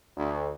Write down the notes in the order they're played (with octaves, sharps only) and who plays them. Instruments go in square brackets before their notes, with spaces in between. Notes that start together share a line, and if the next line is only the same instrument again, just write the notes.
[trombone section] D2